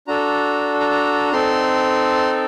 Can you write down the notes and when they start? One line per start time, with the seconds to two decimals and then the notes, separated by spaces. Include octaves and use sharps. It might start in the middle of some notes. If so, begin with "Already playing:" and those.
0.07 D4 F#4 A4 A#5
0.80 A#5
0.91 A#5
1.33 C4 D#4 A4 C6